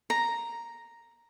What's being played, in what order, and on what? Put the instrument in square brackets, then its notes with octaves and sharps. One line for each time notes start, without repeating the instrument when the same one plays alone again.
[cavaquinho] A#5